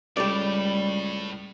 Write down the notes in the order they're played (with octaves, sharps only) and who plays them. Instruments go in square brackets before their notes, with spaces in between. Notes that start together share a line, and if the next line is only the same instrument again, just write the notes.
[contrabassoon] C#2 [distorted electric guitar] A2 [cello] G3 [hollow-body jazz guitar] G4 A4 D5